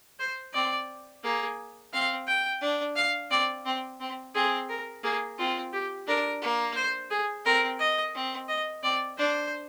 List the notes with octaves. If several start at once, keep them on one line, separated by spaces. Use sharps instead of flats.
C5
C4 D5
A#3 G#4
C4 F5
G5
D4
F5
C4 D5
C4
C4
C4 G#4
A#4
A#3 G#4
C4 F4
G4
D4 A#4
A#3
C5
G#4
C4 A#4
D#5
C4
D#5
C4 D5
D4 C5